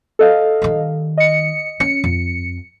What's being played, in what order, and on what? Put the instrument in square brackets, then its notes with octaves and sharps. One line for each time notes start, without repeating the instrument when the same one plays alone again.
[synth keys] A4 D#5 F5
[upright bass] D#3 G3
[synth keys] D#5 C#7
[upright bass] C#4 [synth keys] C#7
[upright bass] F2